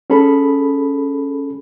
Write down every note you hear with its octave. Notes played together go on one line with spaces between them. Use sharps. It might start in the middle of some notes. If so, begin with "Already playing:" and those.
C#4 G#4 A4 B5